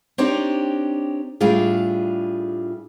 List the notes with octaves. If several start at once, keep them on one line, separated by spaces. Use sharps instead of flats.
C4 D4 D#4 G4 C#5 D5
A2 G3 D4 F4 G#4